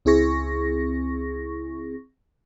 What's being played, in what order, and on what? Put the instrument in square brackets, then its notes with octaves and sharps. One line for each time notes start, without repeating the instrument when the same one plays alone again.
[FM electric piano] C#2 C4 E4 G#4 C#6 A#6